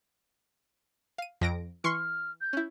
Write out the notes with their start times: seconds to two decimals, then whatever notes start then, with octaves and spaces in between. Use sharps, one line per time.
1.18 F5 D#7
1.41 F2 A#6 D7
1.84 E3 C6 C#6 F6 C7
2.41 G6
2.53 C#4 E4